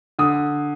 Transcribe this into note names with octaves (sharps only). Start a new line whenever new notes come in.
D3 D#6